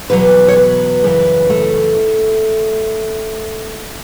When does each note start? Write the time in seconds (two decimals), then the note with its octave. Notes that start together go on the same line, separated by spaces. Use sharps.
0.10 E2 B2 F#3 B4
0.48 C#5
0.56 B4
1.04 F#2 C#3 E3 B4
1.50 A3